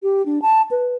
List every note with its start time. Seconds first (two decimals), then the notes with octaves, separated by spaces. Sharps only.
0.03 G4
0.26 D4
0.42 A5
0.71 B4